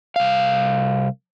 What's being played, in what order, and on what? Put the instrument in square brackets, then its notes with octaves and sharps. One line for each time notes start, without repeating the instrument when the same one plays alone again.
[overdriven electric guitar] C2 F5